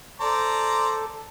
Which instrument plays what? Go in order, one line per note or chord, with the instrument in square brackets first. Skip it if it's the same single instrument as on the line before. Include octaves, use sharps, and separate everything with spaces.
[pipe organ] A4 [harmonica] C5 D5 A#5